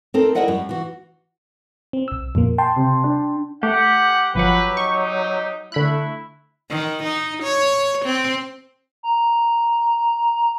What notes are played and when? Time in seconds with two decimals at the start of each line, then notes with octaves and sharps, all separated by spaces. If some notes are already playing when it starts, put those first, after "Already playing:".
0.14 C4 D#4 A4 A#4
0.35 E4 A#4 D5 D#5 F#5 G5
0.48 F#2 G3
0.69 E3 F#4
1.93 C4
2.08 B1 E6
2.35 F2 A#2 A#3
2.58 G5 A5 C6
2.76 C3
3.04 D4
3.63 A3 G4 F#5
4.35 G1 F3 F#3 B4 F#5
4.77 D#4 C#6
5.72 D3 A3 E4 B5 F#6
6.70 D#3
7.04 D#4
7.43 C#5
8.06 C4
9.03 A#5